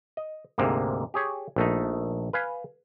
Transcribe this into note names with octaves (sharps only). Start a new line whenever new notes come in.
D#5
D2 G#2 C3 A#3
G4 G#4 C#5
A#1 A3 D#4
B4 F5 G#5